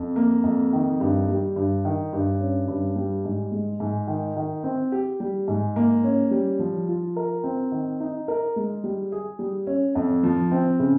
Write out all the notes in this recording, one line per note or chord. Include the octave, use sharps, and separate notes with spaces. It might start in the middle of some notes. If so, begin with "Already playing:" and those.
Already playing: F2
A#3
F2
D#3
G2
G3
G2
D#3
G2
C#4
G2
G3
G#2
G#3
G#2
D#3
D#3
C4
G4
G3
G#2
A#3
C#4
G3
F3
F4
A#4
C4
D#3
D#4
A#4
G#3
G3
G#4
G3
C#4
F2
F3
C4
C#3